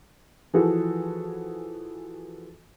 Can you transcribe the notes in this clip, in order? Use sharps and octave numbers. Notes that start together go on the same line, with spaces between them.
E3 F3 F#4 G#4 A4 B4